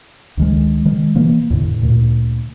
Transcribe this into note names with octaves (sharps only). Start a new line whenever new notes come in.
D2 D#3 G#3
D#3 G#3
B2 E3 A#3
E2 A2 D3
D2 A#2